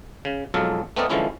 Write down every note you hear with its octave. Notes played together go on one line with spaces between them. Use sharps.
C#3
B1 F2 F#3 G#3 A4 F5
A3 B3 C4 A#4 D5 D#5
D3 E3 F3 G#3 C#4 E4